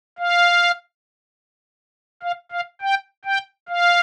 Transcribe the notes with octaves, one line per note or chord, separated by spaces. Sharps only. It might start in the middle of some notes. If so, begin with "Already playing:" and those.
F5
F5
F5
G5
G5
F5